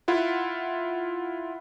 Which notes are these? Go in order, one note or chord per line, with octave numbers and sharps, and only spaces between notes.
E4 F4 F#5